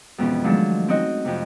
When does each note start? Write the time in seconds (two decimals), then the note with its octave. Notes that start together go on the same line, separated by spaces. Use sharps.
0.18 F2 G#2 B2 E3 C#4
0.44 D#3 F3 F#3 G#3 A3 D4
0.88 C4 C#4 D#4 F#4 D#5
1.25 F2 C3